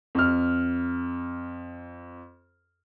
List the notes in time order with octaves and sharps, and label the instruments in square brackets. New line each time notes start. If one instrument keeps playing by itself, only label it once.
[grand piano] F2 F6